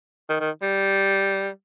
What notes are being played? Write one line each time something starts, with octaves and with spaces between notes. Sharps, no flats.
D#3
D#3
G3